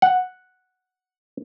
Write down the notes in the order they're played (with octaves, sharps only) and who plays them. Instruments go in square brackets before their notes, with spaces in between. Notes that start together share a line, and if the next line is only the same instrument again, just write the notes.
[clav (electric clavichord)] F#5